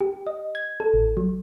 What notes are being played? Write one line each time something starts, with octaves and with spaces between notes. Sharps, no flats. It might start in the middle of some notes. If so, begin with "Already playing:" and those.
G4
D#5
G#6
A4
A1
F#3